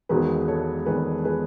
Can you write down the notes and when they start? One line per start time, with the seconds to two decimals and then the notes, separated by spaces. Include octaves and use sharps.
0.09 E1 E2 D#3 G#3 G#4 B4
0.48 A4 C#5
0.86 E1 E2 D#3 G#3 G#4 B4
1.25 G#4 B4